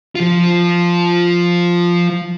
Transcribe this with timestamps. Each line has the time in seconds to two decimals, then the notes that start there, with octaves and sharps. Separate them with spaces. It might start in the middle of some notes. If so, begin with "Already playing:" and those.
0.16 F3 F4